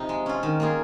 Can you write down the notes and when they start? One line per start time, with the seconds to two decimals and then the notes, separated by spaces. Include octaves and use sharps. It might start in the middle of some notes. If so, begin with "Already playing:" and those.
Already playing: C3 F3 D#4
0.09 G#3
0.26 C#4 F4
0.43 D#3
0.60 A#3 F4 G#4